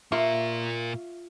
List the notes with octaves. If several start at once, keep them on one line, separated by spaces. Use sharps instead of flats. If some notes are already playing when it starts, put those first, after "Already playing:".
A#2 F4 A#4 E5 C#6